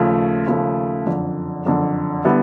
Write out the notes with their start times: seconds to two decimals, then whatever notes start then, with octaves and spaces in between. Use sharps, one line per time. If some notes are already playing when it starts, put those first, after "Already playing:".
Already playing: D#2 C#3 F3 A3
0.46 D#2 C#3 F3 A3
1.06 F#1 F2 D3
1.65 F#1 F2 D3
2.25 D3 G3 B3 E4